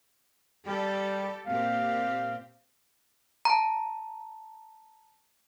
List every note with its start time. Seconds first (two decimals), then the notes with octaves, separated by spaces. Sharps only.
0.67 G3 G4 A4
1.47 A#2 C4 G4 F5
3.45 A5 A#5